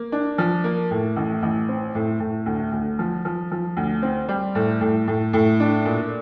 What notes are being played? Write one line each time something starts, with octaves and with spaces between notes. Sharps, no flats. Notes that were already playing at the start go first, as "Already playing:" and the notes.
Already playing: A#3
D4
F3
A#3
A2
A1
A1
C4
A2
A2
D2
D2
F3
F3
F3
D2
C4
G3
A2
A2
A2
A2
D4
A#2